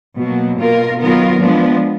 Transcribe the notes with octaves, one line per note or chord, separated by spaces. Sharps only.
B2 F#3 A#3
B2 A#3 F4 A#4
D#3 F#3 B3 F4 A#4
F3 G#3 B3 D4